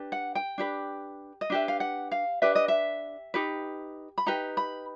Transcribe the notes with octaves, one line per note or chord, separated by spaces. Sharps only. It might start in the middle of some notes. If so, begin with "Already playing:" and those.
Already playing: D4 G4 B4
F#5
G5
D4 G4 B4
D#5
D4 G4 B4 E5
F5
F#5
F5
D4 G4 B4 E5
D#5
E5
D#4 G4 B4
B5
D#4 G4 B4 A#5
B5